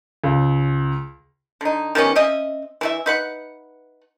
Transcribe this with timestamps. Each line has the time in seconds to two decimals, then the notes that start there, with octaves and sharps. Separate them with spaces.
0.24 C#2
1.61 D3 D#4
1.95 D#3 G3 B3 C#4
2.16 C4 C#4 D#5 E5
2.81 E3 A3 E5
3.06 D#4 B4 F#5